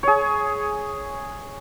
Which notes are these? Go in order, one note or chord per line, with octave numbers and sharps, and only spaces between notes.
G#4 C#5